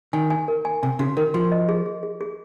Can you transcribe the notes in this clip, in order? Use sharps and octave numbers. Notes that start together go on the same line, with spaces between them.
D#3 G#5
G#5
A#4
G#5
C3 G#5
C#3 F#4
D#3 A#4
F3 F#4
D#5
G#4
G#4
G#4
G#4